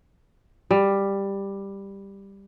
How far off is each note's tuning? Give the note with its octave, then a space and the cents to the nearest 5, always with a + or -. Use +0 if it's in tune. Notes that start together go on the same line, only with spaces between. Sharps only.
G3 +10